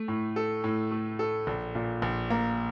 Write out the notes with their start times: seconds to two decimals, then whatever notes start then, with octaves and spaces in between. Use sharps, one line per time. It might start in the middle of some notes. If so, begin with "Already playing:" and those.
Already playing: A3
0.08 A2
0.36 A4
0.64 A2
0.91 A3
1.19 A4
1.47 A#1
1.75 A#2
2.02 A#1
2.30 A#3